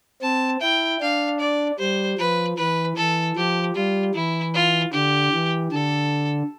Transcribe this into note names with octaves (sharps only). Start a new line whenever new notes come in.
C4 A5
E4 G5
D4 F5
D5
G3 C5
F3 B4
E3 B4
E3 A4
F3 G4
G3 F4
E3 E4
F4
D3 G4
E3
D3 A4